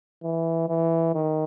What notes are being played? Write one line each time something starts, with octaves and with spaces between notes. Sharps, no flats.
E3
E3
D#3